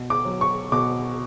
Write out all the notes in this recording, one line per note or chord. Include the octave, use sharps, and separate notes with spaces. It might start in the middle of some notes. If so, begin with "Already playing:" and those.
Already playing: B2
D6
F#3
C#6
B2 D6